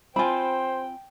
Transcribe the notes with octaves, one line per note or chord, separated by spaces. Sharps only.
C4 F4 C5 G5 G#5 B5